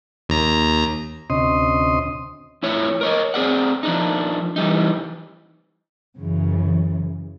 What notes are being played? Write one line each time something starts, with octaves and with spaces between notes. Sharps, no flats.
D#2 A#5
D2 C3 C#4 D#5 C6 D#6
F2 A2 E4 C#5
A#4 C#5 D#5
C4 G#4 D5 F#5
F3 D4 D#4
E3 G3 D#4
F#2 C#3 E3